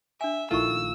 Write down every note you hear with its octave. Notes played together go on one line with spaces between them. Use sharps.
D4 E5 G#5
A#1 D#3 A3 E4 F4 C#6 E6